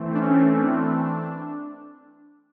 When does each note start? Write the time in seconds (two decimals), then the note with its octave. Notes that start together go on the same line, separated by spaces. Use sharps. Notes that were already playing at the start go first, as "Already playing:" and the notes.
Already playing: E3 A3 C4
0.15 D4
0.20 C#4
0.55 D4